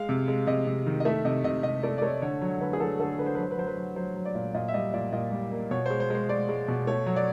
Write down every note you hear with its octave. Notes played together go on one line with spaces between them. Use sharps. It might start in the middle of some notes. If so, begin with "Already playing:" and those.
Already playing: G#3 F5
C3
G#3
C3 D#5
C3
D#3
D#5
A3 E5
C3 D#5
C3 D#5
C3 D#5
A3 D5
D5
A3 C#5
D3 C#5
F#3
D3 B4
G#4
F#3 A4
D3 A4
D3 B4
C5
B4
F#3 C5
B4
F#3 C5
B4
F#3
F#3 C5
F#3
D5
A#2
A#2 D#5
E5
G3 D#5
A#2 D5
A#2 D#5
G3
A#3
B2 C#5
G#3 C5
C5
G#3 C5
G#3 D5
G#3
B2
A3 C#5
F#3
D5